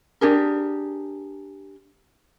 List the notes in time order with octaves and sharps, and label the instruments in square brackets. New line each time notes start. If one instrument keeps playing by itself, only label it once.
[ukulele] D4 G4 G#4 A#4